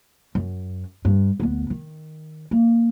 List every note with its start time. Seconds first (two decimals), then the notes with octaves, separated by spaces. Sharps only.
0.35 F#2
1.05 G2
1.40 D2 B3
1.70 D#3
2.51 A#3